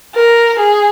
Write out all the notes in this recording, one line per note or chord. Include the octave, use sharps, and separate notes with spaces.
A#4
G#4